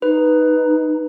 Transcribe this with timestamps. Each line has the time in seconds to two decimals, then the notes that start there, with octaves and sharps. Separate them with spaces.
0.02 D#4 B4